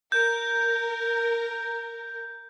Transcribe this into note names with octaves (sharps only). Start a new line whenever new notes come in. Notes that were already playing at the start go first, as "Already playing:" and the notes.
A#4 G6